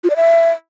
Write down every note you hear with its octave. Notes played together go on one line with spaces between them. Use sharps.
F4
D5
E5